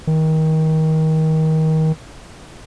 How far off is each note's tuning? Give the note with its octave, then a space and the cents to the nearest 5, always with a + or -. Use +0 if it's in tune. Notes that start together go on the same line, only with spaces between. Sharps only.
D#3 +25